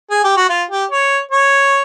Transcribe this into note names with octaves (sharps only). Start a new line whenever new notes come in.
G#4
G4
F#4
F4
G4
C#5
C#5